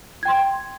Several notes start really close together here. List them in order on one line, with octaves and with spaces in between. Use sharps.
G#6 G5 C6